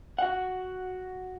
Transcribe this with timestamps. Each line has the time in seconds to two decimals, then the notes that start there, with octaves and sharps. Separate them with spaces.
0.18 F#4 F#5